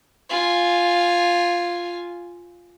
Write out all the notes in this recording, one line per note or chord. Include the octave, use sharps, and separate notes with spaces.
F4 G#5